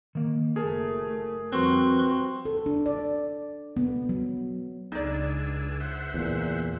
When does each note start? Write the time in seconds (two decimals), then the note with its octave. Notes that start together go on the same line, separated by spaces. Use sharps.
0.15 D#3 A#3
0.56 F#1 A3 G#4 A#4 A5
1.52 F2 F3 G3 C4 F#4 B4 C6 C#6
2.45 A4
2.66 D4
2.86 D5
3.77 B3
4.09 F#3
4.92 C#2 D4 D#4 G#4 D5 E6
5.80 C5 E5 F#5
6.14 E2 A#2